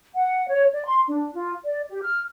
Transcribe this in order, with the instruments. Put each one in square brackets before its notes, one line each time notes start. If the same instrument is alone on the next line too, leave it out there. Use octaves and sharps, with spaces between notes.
[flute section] F#5
C#5
D5
C6
D4
F4
D5
G4
F6